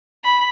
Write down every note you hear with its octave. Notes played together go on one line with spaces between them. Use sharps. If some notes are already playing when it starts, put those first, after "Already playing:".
B5